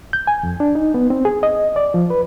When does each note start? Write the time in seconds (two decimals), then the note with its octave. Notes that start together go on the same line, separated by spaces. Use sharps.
0.13 G6
0.27 G#5
0.43 F2
0.60 D4
0.75 D#4
0.94 B3
1.10 C4
1.25 G#4
1.43 D#5
1.76 D5
1.94 F3
2.10 B4